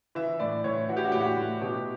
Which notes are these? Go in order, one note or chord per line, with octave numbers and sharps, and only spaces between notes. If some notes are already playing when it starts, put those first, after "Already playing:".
E3 E5
A2 D5
A2 C#5
E3 F#4
G4
F#4
A2 G4
F#4
A2
B2 G4